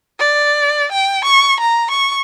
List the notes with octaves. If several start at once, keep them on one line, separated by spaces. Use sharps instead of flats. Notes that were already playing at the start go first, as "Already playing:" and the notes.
D5
G5
C#6
A#5
C#6